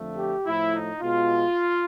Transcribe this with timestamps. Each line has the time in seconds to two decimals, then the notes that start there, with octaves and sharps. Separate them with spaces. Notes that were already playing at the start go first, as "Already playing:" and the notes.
Already playing: F2 D3 F3 A3
0.17 G4
0.45 A2 F3 A3 E4
0.72 D#4
1.01 B2 G#3 F4